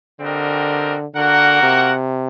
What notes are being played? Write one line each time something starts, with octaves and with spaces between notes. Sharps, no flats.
D3 G3 C4 F#4 A#4 D#5
D3 A#3 F#4 A#4 F#5
C3